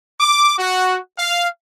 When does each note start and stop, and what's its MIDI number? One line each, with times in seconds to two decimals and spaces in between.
0.20 0.55 86
0.58 0.98 66
1.18 1.47 77